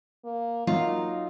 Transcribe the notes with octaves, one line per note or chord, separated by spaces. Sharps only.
A#3
F#3 A#3 D#4 F4